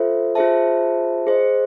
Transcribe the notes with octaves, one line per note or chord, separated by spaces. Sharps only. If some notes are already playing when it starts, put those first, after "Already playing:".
Already playing: F4 A4 C5 E5
F4 G#4 C5 E5 A5
G#4 C5 D#5